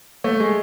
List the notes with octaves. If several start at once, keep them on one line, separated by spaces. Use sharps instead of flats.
A3
G#3